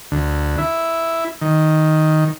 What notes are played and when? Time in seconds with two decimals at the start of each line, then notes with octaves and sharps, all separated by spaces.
0.12 D2
0.58 E4
1.41 D#3